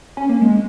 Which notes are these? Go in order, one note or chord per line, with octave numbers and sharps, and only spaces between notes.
C#4
A#3
G#3